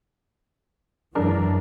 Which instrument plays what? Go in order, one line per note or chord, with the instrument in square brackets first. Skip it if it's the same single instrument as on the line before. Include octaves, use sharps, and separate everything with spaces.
[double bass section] F#2 E3 F#3 [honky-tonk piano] G#3 D4 A#4